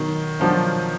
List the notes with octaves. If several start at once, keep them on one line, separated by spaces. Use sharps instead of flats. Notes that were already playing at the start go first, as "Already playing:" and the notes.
Already playing: B2 D#3 F#3
B2 F3 F#3 D4 F4